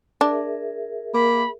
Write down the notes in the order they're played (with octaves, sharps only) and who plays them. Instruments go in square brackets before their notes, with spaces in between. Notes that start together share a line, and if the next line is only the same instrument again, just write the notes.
[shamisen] D4 [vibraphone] G#4 A#4 E5
[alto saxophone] A#3 [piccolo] B5